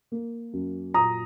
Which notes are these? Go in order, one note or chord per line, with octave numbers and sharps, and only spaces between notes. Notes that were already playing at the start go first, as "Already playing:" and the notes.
A#3
F#2
A#2 A#5 D#6